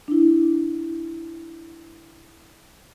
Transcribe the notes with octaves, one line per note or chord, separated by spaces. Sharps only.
D4 E4